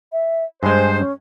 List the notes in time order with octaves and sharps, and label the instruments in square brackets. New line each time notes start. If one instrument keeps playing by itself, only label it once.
[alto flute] E5
[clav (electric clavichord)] G2 G#3 [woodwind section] C5 [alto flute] G#5
[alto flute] C#4